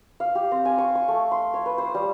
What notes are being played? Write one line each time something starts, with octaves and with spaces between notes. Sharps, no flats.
F5
G4
C4
G#5
C#6
C#6
A3
C6
C#5
B4
C5
G3